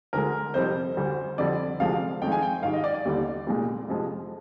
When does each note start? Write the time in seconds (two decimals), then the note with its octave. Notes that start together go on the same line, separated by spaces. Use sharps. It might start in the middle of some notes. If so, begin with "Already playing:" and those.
0.13 D2 D3 G#3 A#4
0.54 F2 C3 G3 C5
0.97 D2 D3 G3
1.38 F2 D3 G3 D5
1.79 D2 C3 F3 G#3 F5
2.21 F2 D#3 G#3 G5
2.32 G#5
2.42 G5
2.63 G#2 D#3 G3 F5
2.73 D#5
2.84 D5
2.94 D5
3.05 D#2 D3 G3
3.47 C2 A#2 G#3
3.88 F2 C3 F3 G#3